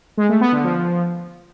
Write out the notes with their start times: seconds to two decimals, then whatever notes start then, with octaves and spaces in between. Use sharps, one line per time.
0.17 G#3
0.29 A3
0.41 B3
0.52 D3
0.64 F3